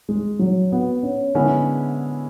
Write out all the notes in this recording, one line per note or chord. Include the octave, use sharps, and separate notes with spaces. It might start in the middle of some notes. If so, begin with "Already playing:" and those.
G#3
F#3
B3
C#4
D3 G#3 B3 C#4 E4 G#4